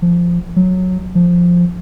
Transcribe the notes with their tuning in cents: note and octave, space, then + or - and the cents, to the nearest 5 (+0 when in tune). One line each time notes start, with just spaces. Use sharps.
F3 -10
F#3 -10
F3 +5